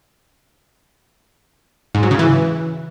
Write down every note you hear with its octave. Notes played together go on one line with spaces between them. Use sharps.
G#2
F#3
C#3
E3